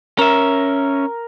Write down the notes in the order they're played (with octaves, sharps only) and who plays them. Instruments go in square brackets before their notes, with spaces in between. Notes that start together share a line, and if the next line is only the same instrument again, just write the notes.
[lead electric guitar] C#4 E5 [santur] A#4